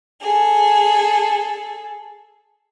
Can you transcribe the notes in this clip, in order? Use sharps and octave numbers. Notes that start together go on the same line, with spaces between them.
G#4 A4